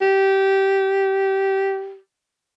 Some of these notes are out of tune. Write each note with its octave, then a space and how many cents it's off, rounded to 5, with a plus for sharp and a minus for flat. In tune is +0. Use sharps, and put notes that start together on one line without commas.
G4 -15